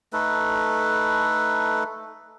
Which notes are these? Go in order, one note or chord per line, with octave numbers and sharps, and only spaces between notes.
A3 D#4 A4 B4